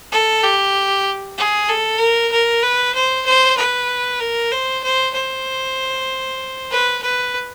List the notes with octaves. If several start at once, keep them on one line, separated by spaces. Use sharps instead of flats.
A4
G4
G#4
A4
A#4
A#4
B4
C5
C5
B4
A#4
C5
C5
C5
B4
B4